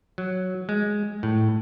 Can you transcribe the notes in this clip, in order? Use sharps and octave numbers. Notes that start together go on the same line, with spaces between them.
F#3
G#3
A2